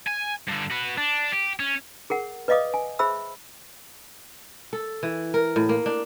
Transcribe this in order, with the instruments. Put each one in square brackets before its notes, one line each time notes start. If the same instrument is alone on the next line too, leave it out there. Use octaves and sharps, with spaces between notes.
[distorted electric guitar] G#5
G2 D3
F#4 B4
D4
G4
C#4
[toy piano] G#4 A#4 F#5
B4 D5 D#5 F5 D6 D#6
G#5
G#4 C5 E5 B5 E6
[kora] A4
E3
A#4
A2
A#3
D4